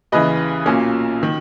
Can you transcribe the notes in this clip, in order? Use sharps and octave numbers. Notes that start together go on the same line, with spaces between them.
D#2 C#3 E3 B4 D#5
B1 A#2 A#3 C#4
D#3